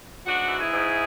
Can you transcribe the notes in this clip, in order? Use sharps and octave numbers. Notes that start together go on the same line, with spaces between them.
G#2 D4 F#4
E3
E4 G#4
G#2